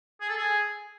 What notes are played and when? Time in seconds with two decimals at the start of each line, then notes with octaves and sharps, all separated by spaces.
0.21 G#4
0.29 A4
0.38 G#4